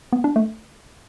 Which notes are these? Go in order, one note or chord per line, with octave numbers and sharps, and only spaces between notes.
B3
D4
A3